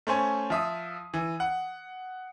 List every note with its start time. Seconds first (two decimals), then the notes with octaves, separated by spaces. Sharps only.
0.07 A3 C#4 C5 G#5
0.50 F3 E5 D#6
1.14 E3
1.40 F#5